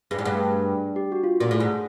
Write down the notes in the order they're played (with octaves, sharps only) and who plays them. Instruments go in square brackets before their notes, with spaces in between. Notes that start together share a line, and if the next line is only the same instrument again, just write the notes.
[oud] G2 [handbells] G#4
[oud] G#2
G2
[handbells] G4
F#4
F4
[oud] A#2
[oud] A2 [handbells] G#4
[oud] G#2